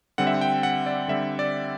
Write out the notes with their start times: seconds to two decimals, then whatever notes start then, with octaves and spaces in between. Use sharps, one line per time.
0.18 D3 G3 C4 F#5
0.27 E5
0.34 F#5
0.41 G5
0.63 F#5
0.86 D5
1.08 D3 G3 C4 E5
1.39 D5